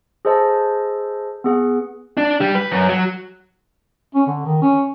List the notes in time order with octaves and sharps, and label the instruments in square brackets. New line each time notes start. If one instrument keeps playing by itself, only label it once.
[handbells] G#4 A4 C5 D#5 A5
B3 G#4 F#5
[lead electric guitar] D4
G3
B4
F#2
F#3
[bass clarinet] C#4
D3
D#3
C#4